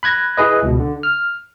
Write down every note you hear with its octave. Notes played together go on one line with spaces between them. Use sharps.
B5 F#6 G#6 A#6
E4 G#4 B4 D#5
C#2 B2
D3
F6